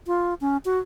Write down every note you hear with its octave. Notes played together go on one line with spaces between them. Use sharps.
F4
C#4
F#4